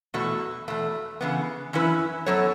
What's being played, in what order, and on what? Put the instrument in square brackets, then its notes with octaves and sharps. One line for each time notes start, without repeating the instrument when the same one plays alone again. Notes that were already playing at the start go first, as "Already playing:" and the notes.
[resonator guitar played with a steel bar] E2 B2 A3 F#4
E2 B2 A3
C#3 E3 B3
F#2 E3 C#4 E4 B4
F#2 F#3 B3 A4 C#5